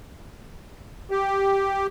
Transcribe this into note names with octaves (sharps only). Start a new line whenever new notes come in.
G4